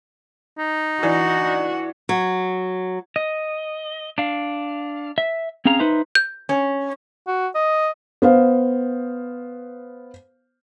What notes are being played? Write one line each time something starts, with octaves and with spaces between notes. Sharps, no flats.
D#4
E3 D4 F#4
F#3
D#5
D4 F5
E5
C4 C#4 G#4 F5 A#5
D#4 B4 C5 E5
G6
C#4
F#4
D#5
B3 C5 F5